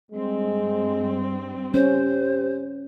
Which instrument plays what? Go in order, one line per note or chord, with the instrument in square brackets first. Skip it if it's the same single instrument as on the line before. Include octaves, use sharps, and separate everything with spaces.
[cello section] G2 C4 [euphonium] G#3
[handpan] C#4 [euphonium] G4 [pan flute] C5